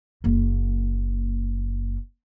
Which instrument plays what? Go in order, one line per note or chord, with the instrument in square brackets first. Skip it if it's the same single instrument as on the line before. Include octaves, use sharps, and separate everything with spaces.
[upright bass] F#1 A#3